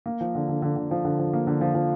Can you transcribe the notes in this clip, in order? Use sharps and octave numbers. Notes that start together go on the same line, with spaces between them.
A#3
F3
D3
D3
D3
D3
F3
D3
F3
A#3
D3
F3
F3